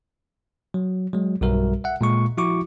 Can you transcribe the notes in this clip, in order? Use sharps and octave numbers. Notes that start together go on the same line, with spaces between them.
F#3
F#3 G#3
B1 G2 G3 F#4 A#4 E5
E5 F#5
A#2 G#3 C#6
F3 E4 F#4 C#6 D6